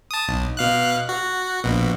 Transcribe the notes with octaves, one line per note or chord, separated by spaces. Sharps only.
A5 D#6
B1
B2 F5 F#6
F#4
A#1 B2